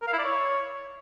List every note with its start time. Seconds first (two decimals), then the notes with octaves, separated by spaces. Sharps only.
0.02 A#4
0.07 F5
0.13 E4
0.19 D5
0.24 C#5